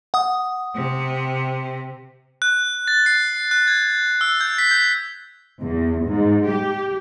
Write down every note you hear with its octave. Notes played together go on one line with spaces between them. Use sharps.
F#5 D#6
C3
F#6
A6
C7
F#6
G#6
E6
G6
B6
G6
E2
G#2
G4